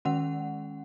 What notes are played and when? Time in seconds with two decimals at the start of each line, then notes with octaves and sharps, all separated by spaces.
0.05 D#3 G#3 C#4 F#5